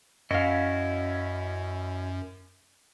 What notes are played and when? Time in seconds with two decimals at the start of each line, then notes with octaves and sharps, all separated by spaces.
0.31 F#2 C#4 E4 F#4 D#5 F5